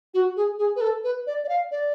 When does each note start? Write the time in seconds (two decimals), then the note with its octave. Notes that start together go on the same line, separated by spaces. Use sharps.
0.14 F#4
0.37 G#4
0.59 G#4
0.76 B4
0.81 A4
1.04 B4
1.27 D5
1.44 D5
1.49 F5
1.71 D5